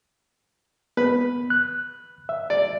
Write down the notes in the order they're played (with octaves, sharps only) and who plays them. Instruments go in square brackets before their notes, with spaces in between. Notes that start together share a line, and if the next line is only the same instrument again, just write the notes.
[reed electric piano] B3 [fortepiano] B4
[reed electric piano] F#6
E5
[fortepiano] D5